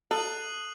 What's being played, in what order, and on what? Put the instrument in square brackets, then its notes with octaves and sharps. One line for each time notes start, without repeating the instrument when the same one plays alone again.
[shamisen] A4 [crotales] D#6 F#6 C7 D#7 F#7